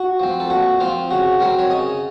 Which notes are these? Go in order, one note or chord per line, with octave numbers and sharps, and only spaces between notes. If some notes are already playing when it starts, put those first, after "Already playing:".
Already playing: F#4
F3 C4
A4
A#2 F#4
F3 C4 F4
C#3 F#4
F#3 C4 A#4
C#5
C#3 D#5